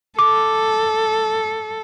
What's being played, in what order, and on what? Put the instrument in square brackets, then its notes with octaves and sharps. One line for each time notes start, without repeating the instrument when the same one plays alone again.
[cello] A4 [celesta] D6